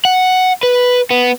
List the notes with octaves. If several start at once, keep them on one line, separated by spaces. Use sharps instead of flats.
F#5
B4
B3